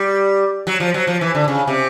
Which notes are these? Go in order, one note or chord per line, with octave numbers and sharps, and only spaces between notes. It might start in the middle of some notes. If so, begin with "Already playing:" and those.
Already playing: G3
F#3
F3
F#3
F3
E3
D3
C#3
C3